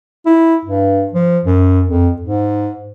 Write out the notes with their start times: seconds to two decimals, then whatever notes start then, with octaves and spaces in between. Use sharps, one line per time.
0.26 E4
0.65 G2
1.13 F3
1.45 F#2
1.86 F2
2.22 G#2